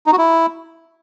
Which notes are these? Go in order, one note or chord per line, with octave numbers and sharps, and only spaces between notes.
D#4
F#4
E4